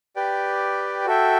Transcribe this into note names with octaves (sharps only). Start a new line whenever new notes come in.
G4 B4 D5 G5
F#4 A4 E5 G5